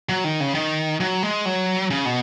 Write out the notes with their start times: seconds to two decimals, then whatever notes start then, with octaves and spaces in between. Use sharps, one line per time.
0.09 F#3
0.24 D#3
0.40 C#3
0.54 D#3
1.00 F#3
1.23 G#3
1.45 F#3
1.90 C#3
2.05 B2